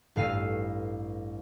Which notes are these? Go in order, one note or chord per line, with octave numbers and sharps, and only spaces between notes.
A1 G2 F5 E6 D#7